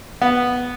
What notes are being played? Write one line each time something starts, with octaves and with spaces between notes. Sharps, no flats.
B3